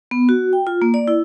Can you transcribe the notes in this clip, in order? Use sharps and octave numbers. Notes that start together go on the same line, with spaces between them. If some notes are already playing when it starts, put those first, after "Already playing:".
B3
F#4
G5
F4
A#3
D5
E4